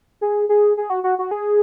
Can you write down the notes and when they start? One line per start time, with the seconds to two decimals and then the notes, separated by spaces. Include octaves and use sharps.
0.21 G#4
0.49 G#4
0.77 G#4
0.90 F#4
1.04 F#4
1.19 F#4
1.31 G#4